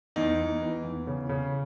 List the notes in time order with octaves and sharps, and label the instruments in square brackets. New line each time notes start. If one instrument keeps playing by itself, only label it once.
[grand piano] E2 D#4
E2
E3
E2
C#3
C#3